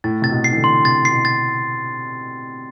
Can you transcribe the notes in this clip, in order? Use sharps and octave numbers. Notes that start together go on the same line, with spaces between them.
A2 A6
C3 A6
B2
C7
E3
D3
C6
C3 A6
C7
B2
A6